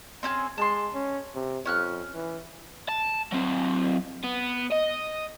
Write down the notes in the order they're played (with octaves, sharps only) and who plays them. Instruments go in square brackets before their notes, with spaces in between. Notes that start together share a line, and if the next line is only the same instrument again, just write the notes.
[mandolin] C4 C#4 G#4
[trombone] G#3 [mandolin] A5 C6
[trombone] C#4
C3
[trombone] F2 [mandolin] C#4 F6 F#6
[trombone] E3
[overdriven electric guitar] A5
F#3 C4
B3
D#5